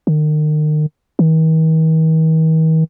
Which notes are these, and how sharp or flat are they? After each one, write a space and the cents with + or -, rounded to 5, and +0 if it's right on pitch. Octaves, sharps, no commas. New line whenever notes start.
D#3 -35
D#3 +45